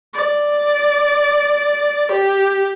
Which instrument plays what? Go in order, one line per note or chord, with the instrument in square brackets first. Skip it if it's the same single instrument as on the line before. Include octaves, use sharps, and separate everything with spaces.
[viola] D5
G4